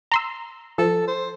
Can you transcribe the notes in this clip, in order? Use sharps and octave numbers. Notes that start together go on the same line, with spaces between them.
A#5 C6 E6
F3 A4
C5